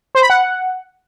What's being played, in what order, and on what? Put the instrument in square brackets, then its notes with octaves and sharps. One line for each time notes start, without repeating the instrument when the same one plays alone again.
[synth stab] C5
B5
F#5